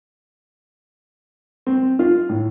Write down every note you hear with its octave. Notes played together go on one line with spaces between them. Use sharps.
C4
F4
A2